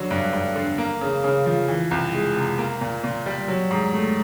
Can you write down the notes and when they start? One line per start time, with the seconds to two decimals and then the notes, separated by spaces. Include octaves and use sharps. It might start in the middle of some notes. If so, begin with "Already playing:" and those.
Already playing: D3 F#3
0.11 G2
0.33 G2
0.56 D3
0.78 A#3
1.01 C#3
1.24 C#3
1.46 F3
1.68 E3
1.91 C2
2.14 G#3
2.36 C3
2.58 A#3
2.81 A#2
3.04 A#2
3.26 G3
3.48 F#3
3.71 G#2
3.94 A3